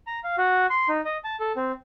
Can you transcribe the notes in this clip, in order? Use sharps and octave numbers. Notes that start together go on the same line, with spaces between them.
A#5
F5
F#4
C6
D#4
D#5
A5
A4
C4